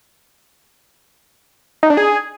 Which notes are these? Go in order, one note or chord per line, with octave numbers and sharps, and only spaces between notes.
D#4
D4
G#4